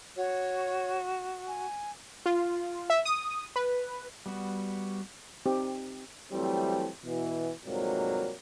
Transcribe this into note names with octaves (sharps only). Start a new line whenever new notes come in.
F#4 C#5
G#5
F4
E5
D#6
B4
G3 B3 F#4
C4 D#4 G4
E3 F#3 G3 A3 C4
B2 E3
F2 G#2 C3 F#3 G3 A#3